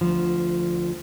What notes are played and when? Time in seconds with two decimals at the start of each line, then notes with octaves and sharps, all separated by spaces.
0.01 D2 F3